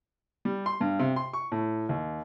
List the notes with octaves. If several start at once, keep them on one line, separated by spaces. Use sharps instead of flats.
G3
C6
G2
C3
C6
C#6
A2
D#2